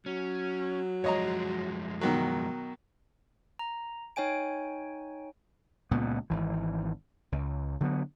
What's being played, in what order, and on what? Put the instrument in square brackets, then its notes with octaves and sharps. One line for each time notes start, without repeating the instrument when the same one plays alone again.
[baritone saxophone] F#3 [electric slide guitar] C#4
[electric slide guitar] F#2 F3 G#3 [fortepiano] C#5 D#5 A#5
[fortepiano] B2 D#3 F#3
[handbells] A#5
D#4 C#5 G5 G#5 D7
[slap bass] C#2 A#2 B3
G#1 E3
C#2
D3 F#3 B3